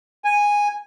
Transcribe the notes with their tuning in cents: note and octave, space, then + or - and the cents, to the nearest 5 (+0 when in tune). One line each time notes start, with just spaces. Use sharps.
G#5 -10